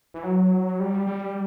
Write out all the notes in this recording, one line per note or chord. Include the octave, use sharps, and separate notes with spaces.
E3
F#3
G3
G3